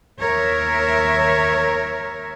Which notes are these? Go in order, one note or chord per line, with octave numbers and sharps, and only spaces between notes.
D#2 A#4 C#5 E5